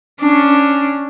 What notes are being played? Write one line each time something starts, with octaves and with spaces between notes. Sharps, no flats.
C#4 D4